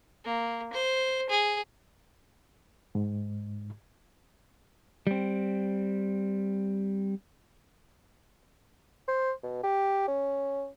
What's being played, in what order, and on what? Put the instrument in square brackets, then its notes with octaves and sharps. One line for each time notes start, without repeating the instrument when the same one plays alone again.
[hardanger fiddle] A#3
C5
G#4
[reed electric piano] G#2
[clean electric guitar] G3 C4
[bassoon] C5
B2
G4
C#4